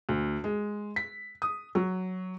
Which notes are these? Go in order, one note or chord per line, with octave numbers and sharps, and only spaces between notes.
D2
G#3
B6
D#6
F#3